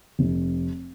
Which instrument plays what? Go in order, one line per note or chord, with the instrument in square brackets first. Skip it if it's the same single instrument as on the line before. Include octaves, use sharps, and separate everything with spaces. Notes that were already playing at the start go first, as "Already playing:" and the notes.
[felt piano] F1